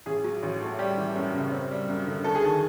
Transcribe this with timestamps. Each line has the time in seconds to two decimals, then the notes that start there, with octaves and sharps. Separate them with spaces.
0.06 A1 G#4
0.24 F#3
0.43 A1
0.61 A2
0.79 G3 G4
0.98 E3
1.16 F#2
1.34 C#3
1.52 C4
1.71 G3
1.89 F#2
2.06 D3
2.24 D2 A4
2.35 G#4
2.43 D#3 A4